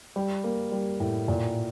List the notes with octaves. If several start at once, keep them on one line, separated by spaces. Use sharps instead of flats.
G3
A#3
G3
A2
A#2